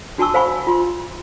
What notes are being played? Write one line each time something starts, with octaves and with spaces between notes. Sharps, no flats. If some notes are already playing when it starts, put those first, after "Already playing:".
D4 F#4 G#5 A5 C#6 E6
C5 F5 F#5 G#5 B5 C#6
F4 C6